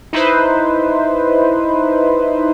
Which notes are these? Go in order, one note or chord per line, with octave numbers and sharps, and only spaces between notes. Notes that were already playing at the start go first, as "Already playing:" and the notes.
D#4 E4 B4 C5